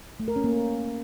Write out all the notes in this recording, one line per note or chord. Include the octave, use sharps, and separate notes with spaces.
A3
A#4
C#4
A#3